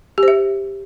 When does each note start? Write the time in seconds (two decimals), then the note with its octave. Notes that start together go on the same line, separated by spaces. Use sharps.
0.18 G4
0.23 C5
0.28 E5